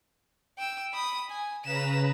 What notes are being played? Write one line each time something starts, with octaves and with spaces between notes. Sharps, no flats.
G5 E6
B5 D#6
G#5
C#3 B4 A#5 B6 E7